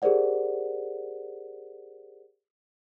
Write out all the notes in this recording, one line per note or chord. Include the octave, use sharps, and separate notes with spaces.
G4 G#4 A#4 C5 D5 F#5